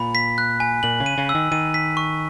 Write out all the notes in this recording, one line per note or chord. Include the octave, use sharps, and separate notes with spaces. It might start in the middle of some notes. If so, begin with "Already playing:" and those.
Already playing: A#2 B5
B6
F#6
G#5
A#2 F#7
C#3
D#7
C#3
E6
D#3
D#3 D#7
B6
C#6